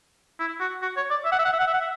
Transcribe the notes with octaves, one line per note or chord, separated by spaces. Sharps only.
E4
F#4
F#4
C#5
D5
E5
F#5
E5
F#5
E5
F#5
E5
F#5
E5